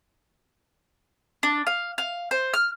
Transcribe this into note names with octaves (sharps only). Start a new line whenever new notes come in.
D4
F5
F5
C5
F6